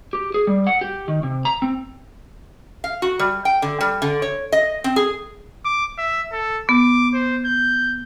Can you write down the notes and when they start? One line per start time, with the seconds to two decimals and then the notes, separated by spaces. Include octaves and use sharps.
0.13 G4
0.34 G#4
0.47 G3
0.67 F#5
0.81 G4
1.08 D#3
1.23 C3
1.45 A#5
1.62 C4
2.84 F5
3.02 F#4
3.19 G3
3.45 G5
3.62 D3
3.81 G3
4.02 D3
4.22 C#5
4.52 D#5
4.84 C4
4.96 G#4
5.65 D6
5.98 E5
6.32 A4
6.69 B3 D6
7.14 C5
7.45 G6